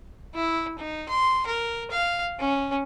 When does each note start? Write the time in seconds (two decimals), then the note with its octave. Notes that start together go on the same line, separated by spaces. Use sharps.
0.35 E4
0.78 D#4
1.09 C6
1.46 A#4
1.91 F5
2.39 C#4